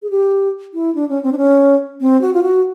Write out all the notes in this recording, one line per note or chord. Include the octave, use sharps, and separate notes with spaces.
G#4
G4
E4
D4
C#4
C4
D4
C#4
C4
F#4
F4
F#4